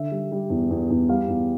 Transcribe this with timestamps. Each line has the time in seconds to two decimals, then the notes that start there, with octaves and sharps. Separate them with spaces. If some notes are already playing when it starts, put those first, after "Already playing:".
Already playing: D3 E5
0.11 G3
0.32 G3
0.50 E2
0.70 E2
0.90 E2
1.09 G3 F5
1.28 E2